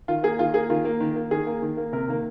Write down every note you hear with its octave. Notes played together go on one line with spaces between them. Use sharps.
D#3 F4
A#3 G#4
D#3 F4
A#3 G#4
D#3 F4
A#3
D#3
A#3
D#3 G#4
A#3
D#3
A#3
C3 A#4
D#3 A#3